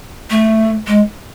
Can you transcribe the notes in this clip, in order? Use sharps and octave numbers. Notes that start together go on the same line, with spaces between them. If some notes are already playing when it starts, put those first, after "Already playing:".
A3
G#3